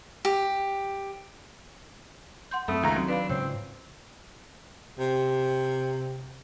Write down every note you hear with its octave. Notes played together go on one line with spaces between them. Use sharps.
G4
F#5 C6 G6
F#2 A3 C4 B5 D#6
C#2 D#3 A#5
F#3 C4
D4 B4 F5 B5
G#2 C#3 C4 C#5
C3